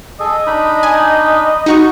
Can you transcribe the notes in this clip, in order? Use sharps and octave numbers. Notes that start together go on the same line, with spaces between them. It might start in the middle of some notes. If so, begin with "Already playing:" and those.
G#4 A4 D#5
D4 D#4 B5
G#5
D#4 F#4 C#6